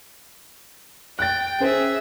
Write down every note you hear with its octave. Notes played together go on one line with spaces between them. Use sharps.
G5 F#6 A6
C#4 G#4 C5 E5